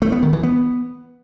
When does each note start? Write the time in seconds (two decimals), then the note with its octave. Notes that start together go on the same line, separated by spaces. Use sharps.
0.02 A3
0.12 B3
0.23 D#3
0.33 E3
0.43 B3